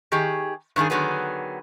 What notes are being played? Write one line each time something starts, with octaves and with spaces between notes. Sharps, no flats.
D#3 G4 G#4
G2 D#3 D4 G#4
D3 D#3 F#3 B3 G#4